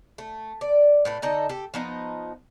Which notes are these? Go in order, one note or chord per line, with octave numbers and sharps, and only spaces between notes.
A3
D5
A2 A3 B4
D3 D#4 A4 D#5
G4 A4
F3 B3 D#4